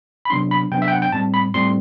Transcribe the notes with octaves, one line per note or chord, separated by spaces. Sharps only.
B5
C3 F#3 B3 D4 C6
B5
C3 F#3 B3 D4 G5
E5
G5
F#5
G5
A2 G3 C4 A5
B5
A2 G3 C4 C6